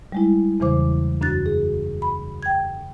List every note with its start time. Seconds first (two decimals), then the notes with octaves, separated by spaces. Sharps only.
0.12 G3 G#3 E4
0.60 E2 C#3 E3 C5 D6
1.21 F#2 D4 F#4 F#6 A6
1.46 G#4
2.02 B5
2.43 G5 G#6